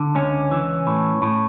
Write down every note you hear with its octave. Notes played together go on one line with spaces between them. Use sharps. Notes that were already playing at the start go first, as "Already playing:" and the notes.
Already playing: D3
C#2 C#4
E3
A2
A2